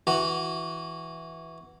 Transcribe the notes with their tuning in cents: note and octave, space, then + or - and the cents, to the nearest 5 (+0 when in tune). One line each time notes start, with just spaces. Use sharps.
E3 +0 F#4 +0